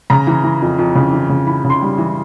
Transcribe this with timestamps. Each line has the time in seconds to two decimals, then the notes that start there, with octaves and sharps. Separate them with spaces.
0.10 C#3 A#5
0.27 E3
0.44 E3
0.62 F2
0.78 F2
0.95 C#3
1.12 E3
1.29 C#3
1.47 E3 B5
1.65 C#3
1.70 C6
1.82 G3
1.98 E3